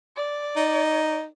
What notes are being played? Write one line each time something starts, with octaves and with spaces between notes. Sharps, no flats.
D5
D#4